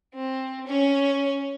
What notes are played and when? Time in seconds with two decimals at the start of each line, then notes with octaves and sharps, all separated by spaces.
0.14 C4
0.67 C#4 C#5